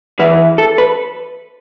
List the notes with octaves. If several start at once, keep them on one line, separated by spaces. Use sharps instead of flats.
E2 E3 B4
A4
B4